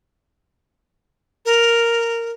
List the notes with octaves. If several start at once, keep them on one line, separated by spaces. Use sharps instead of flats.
A#4